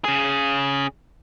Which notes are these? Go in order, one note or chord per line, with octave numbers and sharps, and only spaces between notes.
C#3 G#4